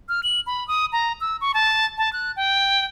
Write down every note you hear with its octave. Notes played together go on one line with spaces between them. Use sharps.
F6
F#7
B5
D#6
A#5
E6
C#6
A5
A5
F#6
G5